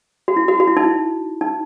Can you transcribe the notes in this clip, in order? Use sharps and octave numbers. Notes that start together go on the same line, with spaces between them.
F#4
E4
F#4
F#4
E4
D#4
E4
D#4